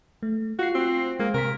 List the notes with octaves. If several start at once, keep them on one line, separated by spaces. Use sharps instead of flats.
A3
F4 F#4 C7
C4
G#3 A#3
C3 A#4 B6